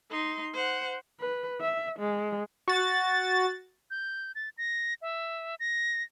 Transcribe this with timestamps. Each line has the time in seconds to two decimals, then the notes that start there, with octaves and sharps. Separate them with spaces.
0.10 D#4 C6
0.53 C5 F#5
1.20 B4
1.61 E5
2.00 G#3
2.68 F#4 A6
3.91 G6
4.35 A6
4.58 A#6
5.02 E5
5.60 A#6